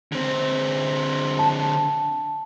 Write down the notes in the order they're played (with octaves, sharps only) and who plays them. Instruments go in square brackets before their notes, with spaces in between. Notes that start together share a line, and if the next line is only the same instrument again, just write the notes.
[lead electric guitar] D3 C4
[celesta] A5